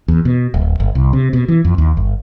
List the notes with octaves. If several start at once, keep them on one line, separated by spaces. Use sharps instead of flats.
E2
B2
D1
G1
C2
C3
B2
E3
F2
D#2
G1